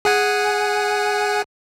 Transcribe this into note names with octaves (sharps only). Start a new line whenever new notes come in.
G#4 F#5 G#5